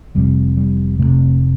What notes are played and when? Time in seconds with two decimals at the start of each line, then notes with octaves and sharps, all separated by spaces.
0.15 F1 F2 C3 G3
0.57 G3
0.99 F2 C3 A3
1.04 F1